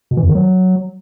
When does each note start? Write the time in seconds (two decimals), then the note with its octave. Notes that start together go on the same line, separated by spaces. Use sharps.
0.11 B2
0.17 E3
0.23 F2
0.29 D#3
0.35 F#3